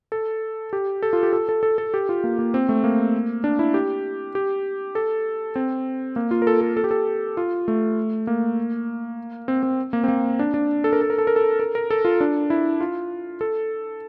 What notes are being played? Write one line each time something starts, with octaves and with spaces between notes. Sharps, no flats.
A4
G4
A4
F4
G4
A4
A4
A4
A4
G4
F4
A#3
A#3
C4
A3
A#3
D4
E4
G4
G4
A4
C4
A#3
F4
A#4
A4
A4
A4
G4
A4
F4
A3
A#3
C4
C4
A#3
C4
A#3
D4
D4
A4
A#4
A4
A#4
A4
A#4
A4
A#4
A#4
A4
F4
D4
E4
F4
A4